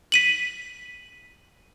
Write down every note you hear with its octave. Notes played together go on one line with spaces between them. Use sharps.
B6 D#7 F#7